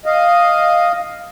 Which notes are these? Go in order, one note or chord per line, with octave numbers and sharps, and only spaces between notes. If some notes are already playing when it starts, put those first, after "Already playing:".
D#5 F5